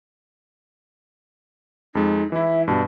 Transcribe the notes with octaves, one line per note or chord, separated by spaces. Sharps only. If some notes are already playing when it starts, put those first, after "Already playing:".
F2 G#3 D#4
E3 E4 E5
G2 B2 G3 A5